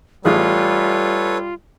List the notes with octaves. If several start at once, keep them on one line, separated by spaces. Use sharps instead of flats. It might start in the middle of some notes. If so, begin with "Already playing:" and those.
A1 G3 F4 G#4 A4 B4 C#5